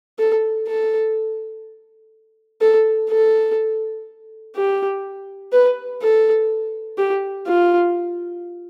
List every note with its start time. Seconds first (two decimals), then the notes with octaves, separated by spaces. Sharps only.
0.19 A4
0.68 A4
2.61 A4
3.10 A4
4.56 G4
5.52 B4
6.02 A4
6.98 G4
7.47 F4